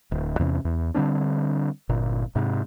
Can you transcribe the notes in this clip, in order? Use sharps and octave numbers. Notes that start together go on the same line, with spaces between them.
D1
E2 C3 B3 C#4
E2
D3 G3 C4 D4
G1 A#2
G#2 C3